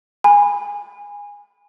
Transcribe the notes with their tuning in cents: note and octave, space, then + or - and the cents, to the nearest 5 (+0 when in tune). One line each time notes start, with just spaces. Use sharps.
G#5 -20 B5 +0